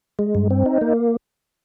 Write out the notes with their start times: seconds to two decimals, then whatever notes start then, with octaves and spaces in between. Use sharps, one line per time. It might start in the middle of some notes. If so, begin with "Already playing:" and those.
0.19 G#3
0.35 G2
0.50 C4
0.66 D#4
0.81 A#3